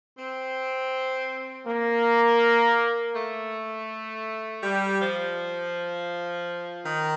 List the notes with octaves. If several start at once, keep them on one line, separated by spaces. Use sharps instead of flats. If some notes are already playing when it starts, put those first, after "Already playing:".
C4
A#3
A3
G3
F3
D#3